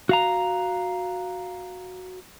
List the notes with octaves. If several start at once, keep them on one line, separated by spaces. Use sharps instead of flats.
F#4 F5 A#5